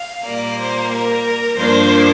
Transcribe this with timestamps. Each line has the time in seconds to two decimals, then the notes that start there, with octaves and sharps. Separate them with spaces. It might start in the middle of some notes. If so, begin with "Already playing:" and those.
Already playing: F5
0.26 A#2 G3 A#3 D5
0.59 C5
0.91 A#4
1.57 G2 F3 A#3 D4 C5